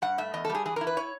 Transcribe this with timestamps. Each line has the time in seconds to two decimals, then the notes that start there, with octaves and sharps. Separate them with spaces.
0.02 G2 F#5
0.18 A3 E5
0.34 E2 D#5
0.45 A4
0.50 G3 G#4
0.65 E3 G#4
0.76 E4 A#4
0.87 B4
0.97 C#5